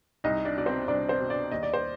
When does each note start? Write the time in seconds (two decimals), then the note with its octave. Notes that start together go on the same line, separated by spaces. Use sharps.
0.24 C2 D#4 D#5
0.45 D4 D5
0.57 B2 D5
0.66 C4 C5
0.88 C2 D4 D5
1.09 C4 C5
1.19 B2
1.30 D4 D5
1.51 D#2 D#5
1.63 D5
1.74 C5